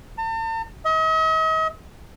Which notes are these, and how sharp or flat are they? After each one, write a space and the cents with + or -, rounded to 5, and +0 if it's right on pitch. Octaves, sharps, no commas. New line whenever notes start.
A5 +40
D#5 +40